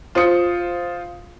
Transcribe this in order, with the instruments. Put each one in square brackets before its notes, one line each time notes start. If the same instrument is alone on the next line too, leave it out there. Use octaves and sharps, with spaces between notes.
[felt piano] F4 C5 D#6 C#7